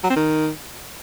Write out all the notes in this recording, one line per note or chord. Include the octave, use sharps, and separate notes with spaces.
F#3
C4
D#3